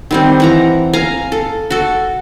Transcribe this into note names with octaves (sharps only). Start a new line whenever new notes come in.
D#3 G3 C4
E3 F#5 A#5
F5 G#5 A#5
A4
F#4 A4